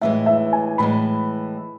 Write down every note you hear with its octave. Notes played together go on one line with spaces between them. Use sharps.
A2 E3 G#3 E5
E5
G#5
A2 E3 G#3 B5